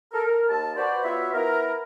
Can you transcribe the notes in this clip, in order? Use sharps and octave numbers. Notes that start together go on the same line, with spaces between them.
A4 A#4
A#4
D#2 A5
F#4 B4 C5 D5
B3 F4 F#4 B4 C#5 E5
B3 E4 A#4